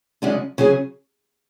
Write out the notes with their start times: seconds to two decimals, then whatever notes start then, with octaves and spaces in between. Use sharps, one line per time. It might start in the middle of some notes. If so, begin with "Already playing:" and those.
0.22 F#2 C#3 G#3 D4
0.58 C#3 F#3 C#4 G#4